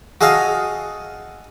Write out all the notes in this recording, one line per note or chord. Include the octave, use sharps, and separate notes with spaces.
F#4 G#4 A4 D#5 F5